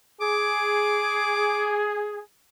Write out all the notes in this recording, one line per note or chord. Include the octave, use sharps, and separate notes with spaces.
G#4 D6